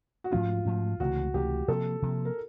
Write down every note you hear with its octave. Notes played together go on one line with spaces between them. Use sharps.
F#4
G#2 F3 A3 C#4 F4
G#2 F3 A3 C#4
C#2 C3 E3 A3 F#4
C#2 C3 E3 A3 G4
C3 F3 A#3 A4
C3 F3 A#3
A#4